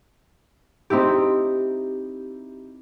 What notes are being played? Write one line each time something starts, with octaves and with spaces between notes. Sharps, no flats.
C4 D#4 E4 G4